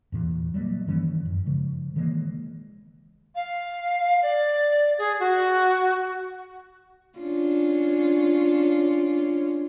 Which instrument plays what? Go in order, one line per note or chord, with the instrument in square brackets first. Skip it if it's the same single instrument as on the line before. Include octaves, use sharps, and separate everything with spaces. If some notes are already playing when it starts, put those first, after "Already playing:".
[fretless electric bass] E2 A#2 E3
F#3 G3 A3 A#3
G2 D#3 E3 C#4
F#2
C#3 F3 G#3
D#3 E3 G#3 A#3
[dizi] F5
D5
G#4
F#4
[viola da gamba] C#4 D4 F4